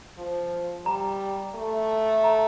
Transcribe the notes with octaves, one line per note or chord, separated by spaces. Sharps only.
F3
G3 A#5
A3
A#5